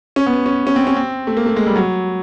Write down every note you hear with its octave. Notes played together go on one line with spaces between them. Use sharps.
C#4
B3
C#4
C#4
C4
C#4
C4
A3
A#3
A3
G#3
G3
F#3